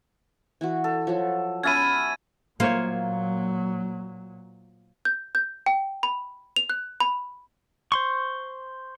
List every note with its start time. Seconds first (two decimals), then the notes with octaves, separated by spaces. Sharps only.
0.61 E3 E4 F#4
0.84 A4
1.07 F3 F#3 F#4
1.63 B3 C#4 E5 B5 G#6 A6 D#7
2.60 A#2 F#3 A#3 F4 C5 C#5
5.05 G6
5.35 G6
5.66 G5
6.03 B5
6.56 F7
6.70 F#6
7.00 B5
7.92 C5 C6 C#6